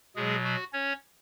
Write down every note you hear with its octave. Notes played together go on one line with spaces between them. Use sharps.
B2 F#3 G#3 G#4
F#4
C#4 C#5